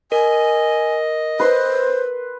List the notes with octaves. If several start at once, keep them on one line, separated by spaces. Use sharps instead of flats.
A#4 D#5 G#5
B4 C5 C6